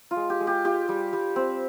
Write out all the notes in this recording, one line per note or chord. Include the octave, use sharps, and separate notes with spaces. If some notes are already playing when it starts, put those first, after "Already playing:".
F4
G#3
G4
G#3
G4
F4 G4
G3
G3
C4